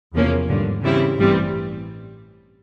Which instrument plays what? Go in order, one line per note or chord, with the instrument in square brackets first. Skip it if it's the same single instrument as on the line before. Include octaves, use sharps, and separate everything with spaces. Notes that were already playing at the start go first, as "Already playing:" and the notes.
[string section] E2 C3 F3 A#3 C#4
G#1 G2 D3
C#3 E3 G3 C4 E4
A1 G2 E3 G3 C4